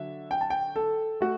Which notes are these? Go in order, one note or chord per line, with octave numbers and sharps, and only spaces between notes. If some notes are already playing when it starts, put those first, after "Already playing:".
Already playing: D3 F#3 E5
G5
A5
G5
A4
A3 F#4